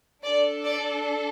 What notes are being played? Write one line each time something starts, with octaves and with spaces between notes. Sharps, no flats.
D4 A4 D5
D5